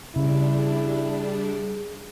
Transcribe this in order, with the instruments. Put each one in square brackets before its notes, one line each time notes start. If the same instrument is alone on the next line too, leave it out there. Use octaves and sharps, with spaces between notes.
[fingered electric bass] C#3 [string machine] G3 D4 [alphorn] E4 [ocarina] G#4